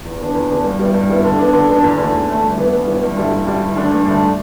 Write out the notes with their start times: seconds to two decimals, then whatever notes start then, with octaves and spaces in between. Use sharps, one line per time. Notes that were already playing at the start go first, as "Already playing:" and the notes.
0.05 E2
0.20 D3 B3 D4
0.35 E2
0.49 D3 B3 D4
0.65 G2
0.79 G3 B3 E4
0.94 G2
1.09 G3 B3 E4
1.24 D3
1.39 B3 D4
1.53 D3
1.69 B3 D4
1.84 E2
1.98 D3 A3
2.12 E2
2.28 D3 A3
2.43 G2
2.57 E3 B3 E4
2.73 G2
2.87 E3 B3 E4
3.03 G2
3.17 D3 G3 E4
3.32 G2
3.47 D3 G3 E4
3.62 G2
3.76 D3 A3 D4
3.92 G2
4.06 D3 A3 D4